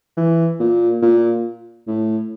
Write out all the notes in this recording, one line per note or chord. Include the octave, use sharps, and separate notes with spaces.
E3
A#2
A#2
A2